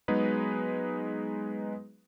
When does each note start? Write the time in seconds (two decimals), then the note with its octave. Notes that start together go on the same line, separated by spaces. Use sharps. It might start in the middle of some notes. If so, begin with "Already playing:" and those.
0.08 F#3 G#3 B3 D#4 G#4 B4